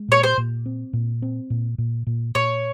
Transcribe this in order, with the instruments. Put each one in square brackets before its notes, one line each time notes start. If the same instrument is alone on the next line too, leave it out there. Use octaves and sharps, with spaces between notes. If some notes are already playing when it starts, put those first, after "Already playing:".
Already playing: [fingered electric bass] G#3
[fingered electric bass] A#2 [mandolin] C#5
[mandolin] C5
[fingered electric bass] A#2
C4
A#2
C4
A#2
A#2
A#2
[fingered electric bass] A#2 [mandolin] C#5